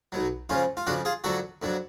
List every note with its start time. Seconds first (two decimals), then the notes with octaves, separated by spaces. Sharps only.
0.12 B1 B2 F#3
0.49 F2 C#3 F3 C#4 F4
0.77 F4
0.87 F2 C#3 F3 D4 F#4
1.05 F4 G#4
1.24 F2 D3 F#3 F#4 A4
1.62 F2 D3 F#3